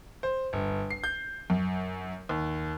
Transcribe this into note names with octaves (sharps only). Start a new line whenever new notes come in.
C5
G1
C7
G6
F#2
D#2